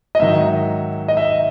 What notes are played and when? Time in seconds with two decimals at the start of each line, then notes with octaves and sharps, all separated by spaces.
0.15 D#5
0.20 G#2 D#3 F#3 E5
1.08 D#5
1.17 E5